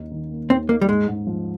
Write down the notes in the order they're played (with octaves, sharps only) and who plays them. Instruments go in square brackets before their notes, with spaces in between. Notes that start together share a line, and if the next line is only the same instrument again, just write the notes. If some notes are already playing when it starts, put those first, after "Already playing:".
Already playing: [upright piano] D#2 D#4
D#3
A#3
[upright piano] D#2 [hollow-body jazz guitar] C4
[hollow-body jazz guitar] A#3 [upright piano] D#4
[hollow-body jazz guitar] G3
[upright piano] G#2 [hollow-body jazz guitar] G#3
[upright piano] G#2
F3